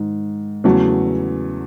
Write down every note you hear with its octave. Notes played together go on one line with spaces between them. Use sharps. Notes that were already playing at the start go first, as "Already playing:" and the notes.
Already playing: G#2 D#3
E2 C#3 F#3 A3